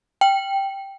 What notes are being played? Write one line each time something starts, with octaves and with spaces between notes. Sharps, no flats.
G5